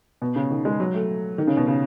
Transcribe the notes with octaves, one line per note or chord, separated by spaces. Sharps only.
B2
C#3
D#3
G#3
F#3
A3
D#3
C#3
B2
C#3